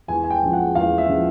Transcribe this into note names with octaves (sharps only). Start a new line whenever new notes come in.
E2 G#5
G#5
G5
C#3 F3
F#5
E2 F5
E5
C#3 F3